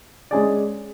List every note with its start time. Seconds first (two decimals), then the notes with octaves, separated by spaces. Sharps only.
0.31 G#3 C#4 G#4 D5